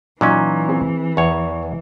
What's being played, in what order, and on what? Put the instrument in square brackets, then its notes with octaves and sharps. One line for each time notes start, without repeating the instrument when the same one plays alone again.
[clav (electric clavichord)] A#2 F#3 C#4 [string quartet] E3 [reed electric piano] D#4
[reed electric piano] C4 G#4
[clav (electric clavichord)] E2 C#5 [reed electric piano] C#6